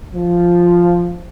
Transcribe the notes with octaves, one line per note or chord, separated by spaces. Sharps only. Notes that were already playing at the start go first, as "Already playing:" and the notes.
F3